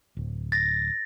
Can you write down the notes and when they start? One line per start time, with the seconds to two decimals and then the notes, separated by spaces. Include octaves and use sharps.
0.17 D1
0.52 A6 A#6